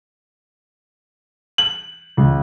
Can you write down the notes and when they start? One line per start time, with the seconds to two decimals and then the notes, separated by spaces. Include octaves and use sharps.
1.58 F#7
2.17 C#2